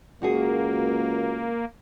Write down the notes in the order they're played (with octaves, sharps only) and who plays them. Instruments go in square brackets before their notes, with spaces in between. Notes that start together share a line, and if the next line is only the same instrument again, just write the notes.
[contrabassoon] C#2 [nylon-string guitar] F#2 F#4 G#4 [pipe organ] A#3